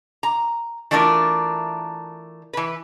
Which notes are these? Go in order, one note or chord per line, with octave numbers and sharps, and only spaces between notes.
A#5
E3 A3 D4 F4 A4 A#4
E3 B4